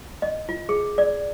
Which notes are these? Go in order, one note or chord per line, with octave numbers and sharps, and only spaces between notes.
D#5
F4
G#4
D5